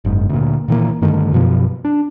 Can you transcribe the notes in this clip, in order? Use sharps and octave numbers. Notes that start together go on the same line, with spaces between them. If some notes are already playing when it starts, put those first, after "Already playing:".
F#1 G#2
D2 A#2
A#2 D#3 E3 A#3
G2 D3 D#3 A3
F#2 B2 F3
D4